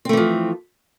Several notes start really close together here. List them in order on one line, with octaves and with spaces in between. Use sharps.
C4 A3 E3 F3